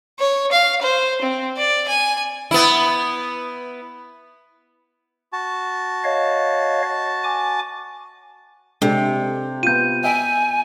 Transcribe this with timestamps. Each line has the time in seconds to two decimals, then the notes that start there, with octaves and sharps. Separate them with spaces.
0.19 C#5
0.52 F5
0.82 C5
1.21 C4
1.57 D5
1.88 G#5
2.51 B3 E4
5.33 F#4 A5
6.04 C#5 D#5 F5
7.24 G#5 D6
8.82 C3 G#3 D4 A4
9.63 B3 F4 G6 D#7
10.04 D#5 E5 G5 G#5